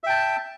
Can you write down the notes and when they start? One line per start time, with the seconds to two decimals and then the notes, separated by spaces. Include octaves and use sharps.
0.04 E5
0.06 G5
0.09 A5